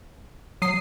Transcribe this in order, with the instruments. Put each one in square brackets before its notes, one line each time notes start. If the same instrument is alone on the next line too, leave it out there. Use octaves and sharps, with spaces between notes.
[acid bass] F#3 [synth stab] D#6 C7